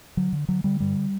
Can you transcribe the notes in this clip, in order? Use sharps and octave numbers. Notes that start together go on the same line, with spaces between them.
D3 F#3
D3
D3 F#3
D3 G3
G2 G3